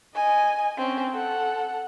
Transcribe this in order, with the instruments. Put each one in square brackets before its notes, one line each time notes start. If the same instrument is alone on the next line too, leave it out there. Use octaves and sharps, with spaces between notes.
[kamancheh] D#5 G#5
C4 C#4
A4 F#5